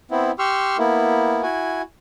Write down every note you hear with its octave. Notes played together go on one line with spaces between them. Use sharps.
B3 C4 E4
G4 C6 C#6 E6 F6
A#3 B3 E4
E4 F#4 G#5